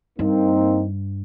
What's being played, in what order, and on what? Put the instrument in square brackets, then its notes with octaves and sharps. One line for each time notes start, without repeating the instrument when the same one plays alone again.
[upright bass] G2 [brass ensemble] A#3 C4 D#4